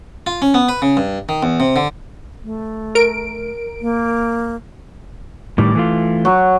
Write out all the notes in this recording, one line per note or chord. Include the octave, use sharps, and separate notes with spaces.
F4
C#4
B3
B4
C#3
G2
D#3
E2
C3
D3
A3
A#4 D7
A#3
A2 D#3 G3 D6
E3 A3 F4
F#3